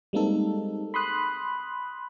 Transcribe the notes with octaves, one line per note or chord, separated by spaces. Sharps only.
G3 G#3 A#3 C4 D#4 A4
B5 C6 D#6 F#6